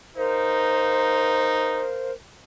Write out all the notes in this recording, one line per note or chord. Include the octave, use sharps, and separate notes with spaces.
D#4 A#4 C5 F5